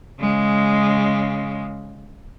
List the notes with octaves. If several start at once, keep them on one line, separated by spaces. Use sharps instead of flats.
C#3 G#3